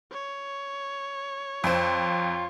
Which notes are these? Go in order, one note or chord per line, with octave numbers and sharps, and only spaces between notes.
C#5
F2 F4 C5